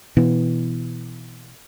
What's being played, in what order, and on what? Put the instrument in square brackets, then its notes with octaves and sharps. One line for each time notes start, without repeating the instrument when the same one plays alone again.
[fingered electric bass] B2 E3